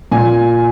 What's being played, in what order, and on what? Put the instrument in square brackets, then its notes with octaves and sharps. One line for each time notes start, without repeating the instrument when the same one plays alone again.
[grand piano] A#2 G#5